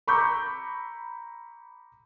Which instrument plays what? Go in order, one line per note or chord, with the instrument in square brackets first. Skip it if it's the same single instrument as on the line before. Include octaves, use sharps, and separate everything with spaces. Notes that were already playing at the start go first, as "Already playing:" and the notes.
[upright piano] A#5 B5 C#6 D6 E6 G6